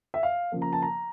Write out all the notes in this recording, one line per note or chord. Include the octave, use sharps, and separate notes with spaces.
E5
F5
C#3 F3 A#3
A#5
A5
A#5